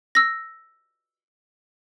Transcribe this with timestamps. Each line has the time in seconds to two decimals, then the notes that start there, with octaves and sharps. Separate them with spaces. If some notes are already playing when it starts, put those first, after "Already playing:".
0.15 E6 A#6